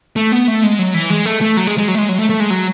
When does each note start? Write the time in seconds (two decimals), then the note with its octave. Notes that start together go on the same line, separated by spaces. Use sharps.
0.16 A3
0.32 B3
0.48 A3
0.63 G#3
0.79 F#3
0.94 E3
1.10 G#3
1.26 A3
1.41 A3
1.57 F#3
1.67 G#3
1.78 G#3
1.88 F#3
1.95 A3
1.98 G#3
2.09 F#3
2.19 A3
2.29 A3
2.40 G#3
2.50 F#3